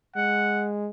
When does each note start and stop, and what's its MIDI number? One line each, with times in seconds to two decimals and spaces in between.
0.16 0.90 56
0.16 0.68 78